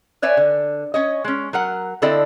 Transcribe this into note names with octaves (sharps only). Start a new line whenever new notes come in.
B4 C#5 D5 E5 G#5
D3
C#4 C#5 D#5
G#3 C#4
F#3 A#4 F#5
D3 C4 E4 A4 D5 D#5